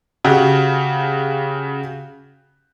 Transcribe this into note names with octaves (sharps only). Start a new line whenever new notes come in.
C#3 F#4 G4